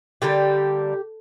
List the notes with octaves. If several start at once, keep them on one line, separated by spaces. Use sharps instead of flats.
D3 G3 A#3 G4